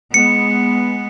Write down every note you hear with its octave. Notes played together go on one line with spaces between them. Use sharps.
G#3 B3 C#7